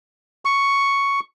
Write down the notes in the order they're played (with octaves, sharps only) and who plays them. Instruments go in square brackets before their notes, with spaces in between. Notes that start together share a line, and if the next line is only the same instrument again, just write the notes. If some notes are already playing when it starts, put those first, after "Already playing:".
[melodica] C#6